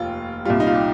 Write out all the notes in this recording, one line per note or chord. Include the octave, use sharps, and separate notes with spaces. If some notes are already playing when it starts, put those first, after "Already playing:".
Already playing: F1 D#2 F4
C2 A#2 G3 F4
D#4
F4
G4